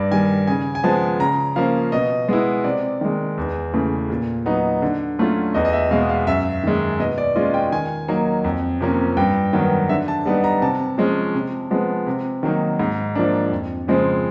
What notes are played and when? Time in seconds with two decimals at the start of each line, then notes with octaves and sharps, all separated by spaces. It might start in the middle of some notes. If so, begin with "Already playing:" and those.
Already playing: G2 D5
0.11 D#3 G3 G#5
0.47 C#3 G#5
0.75 G#5
0.84 F3 G#3 B3 A5
1.20 C#3 A#5
1.56 F3 A#3 C#4 F5
1.92 B2 D#5
2.29 G#3 B3 E4
2.64 C3 D5
3.01 D#3 G#3
3.38 E2
3.73 C#3 E3 A3
4.10 A#2
4.46 F#3 B3 D#4
4.82 D3
5.18 F#3 A3 C#4 F4
5.54 E2 D#5
5.65 D#5
5.73 E5
5.91 B2 G#3 B3 F5
6.09 F5
6.27 F#2 E5
6.64 D#3 G#3
6.99 B2 D#5
7.18 D5
7.36 G#3 C#4 F4 D#5
7.54 G5
7.72 D#3 G#5
8.08 F#3 A#3 D#4
8.44 F2
8.81 C3 F3 A#3 C#4
9.17 G2 G5
9.53 D#3 F#3 B3
9.89 D3 E5
10.08 A5
10.26 G3 B3 D#4
10.44 A#5
10.62 C3 A5
10.98 F3 G#3 C#4
11.34 C3
11.71 F3 G#3 B3
12.07 C3
12.43 D#3 F#3 A#3 D#4
12.80 G#2
13.15 F3 A#3 D4
13.52 F2
13.88 C#3 F3 G#3 C4